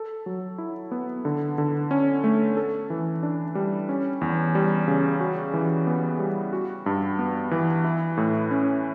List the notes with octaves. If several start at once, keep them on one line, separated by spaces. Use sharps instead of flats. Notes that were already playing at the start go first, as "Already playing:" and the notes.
Already playing: A4
F#3
E4
B3
D3
D3
C#4
A3
A4
E3
D4
G3
C#4
E2
G3
C#3
F#4
E3
B3
G3
F#4
G2
B3
E3
E4
A2
C#4